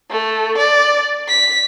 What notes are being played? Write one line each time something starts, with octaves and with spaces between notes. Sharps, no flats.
A3
D5
B6